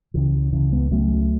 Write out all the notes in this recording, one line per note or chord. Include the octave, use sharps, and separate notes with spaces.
C#2 C#3 E3
C#2 C#3 E3
G#3 B3
C#2 C#3 F#3 A3